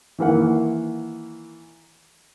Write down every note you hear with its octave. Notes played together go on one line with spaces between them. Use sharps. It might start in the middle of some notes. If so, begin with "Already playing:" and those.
D#3 E3 A#3 F#5